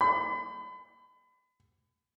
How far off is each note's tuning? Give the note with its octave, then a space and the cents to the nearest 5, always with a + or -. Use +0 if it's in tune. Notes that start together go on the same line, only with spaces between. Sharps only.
B5 +35